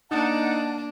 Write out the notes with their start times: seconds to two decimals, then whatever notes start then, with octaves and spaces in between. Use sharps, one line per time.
0.11 A#3 D4 D#4 F#5 A5